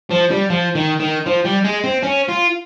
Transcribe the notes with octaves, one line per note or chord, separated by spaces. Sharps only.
F3
G3
F3
D#3
D#3
F3
G3
G#3
C4
C#4
F4